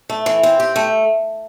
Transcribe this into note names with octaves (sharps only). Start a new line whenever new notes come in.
A3
E3
C4
G4
A3